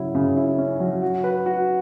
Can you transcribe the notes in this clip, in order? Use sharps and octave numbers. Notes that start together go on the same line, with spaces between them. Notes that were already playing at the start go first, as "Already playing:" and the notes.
Already playing: C#3 F#3 E4
C#3
E4
C#4
F#3
F#4
B4
F#4